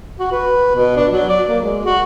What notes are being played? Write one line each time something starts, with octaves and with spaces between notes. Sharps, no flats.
F#4
B4
B2
D4
F#3
D5
A#3
G#3
F#4